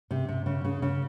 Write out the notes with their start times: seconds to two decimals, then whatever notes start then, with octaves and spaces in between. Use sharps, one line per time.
0.11 C3
0.29 C3
0.46 C#3
0.65 C#3
0.82 C#3